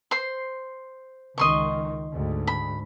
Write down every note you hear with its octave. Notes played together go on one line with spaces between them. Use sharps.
C5 C6
C#2 D#3 D#5 C6 C#6
D2 G#2
B5